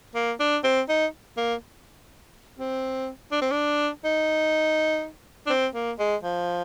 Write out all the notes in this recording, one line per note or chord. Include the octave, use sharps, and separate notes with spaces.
A#3
D4
C4
D#4
A#3
C4
D4
C4
D4
D#4
D4
C4
A#3
G#3
F3